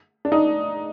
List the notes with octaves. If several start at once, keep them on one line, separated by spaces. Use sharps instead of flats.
D4
D#4